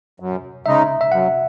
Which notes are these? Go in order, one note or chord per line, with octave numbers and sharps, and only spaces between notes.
F#2
C#3 G#3 D#4 E5
E5
F#2 F#5